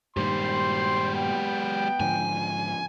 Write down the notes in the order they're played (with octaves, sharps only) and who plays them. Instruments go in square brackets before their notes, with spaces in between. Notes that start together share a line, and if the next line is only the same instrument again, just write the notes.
[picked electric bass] G2 A#2 D#3 [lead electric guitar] G#3 G4 [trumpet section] C5 G5 C6
[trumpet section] B3 G5
[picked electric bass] G#2 D3 F3 [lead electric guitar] G#5